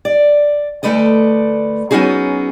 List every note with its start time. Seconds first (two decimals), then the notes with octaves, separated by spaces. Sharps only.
0.05 D5
0.83 D2 A#2 A3 B4 D5 D#5
1.91 F#3 B3 C#4 D#4 F#4 G#4